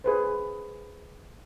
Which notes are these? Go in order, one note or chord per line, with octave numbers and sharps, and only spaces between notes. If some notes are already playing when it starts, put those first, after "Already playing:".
G#4 B4 C5